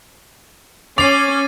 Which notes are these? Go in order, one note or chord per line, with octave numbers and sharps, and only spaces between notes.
C#4 D6 A6 C7 D#7 F7